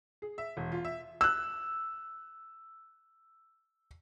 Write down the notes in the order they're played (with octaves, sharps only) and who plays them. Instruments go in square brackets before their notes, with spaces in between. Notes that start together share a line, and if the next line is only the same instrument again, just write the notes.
[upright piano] G#4
E5
E1
F4
E5
[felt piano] E6 F#6